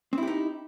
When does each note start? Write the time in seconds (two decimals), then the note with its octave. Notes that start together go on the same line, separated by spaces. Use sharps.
0.13 C4
0.18 E4
0.23 G4
0.28 D#4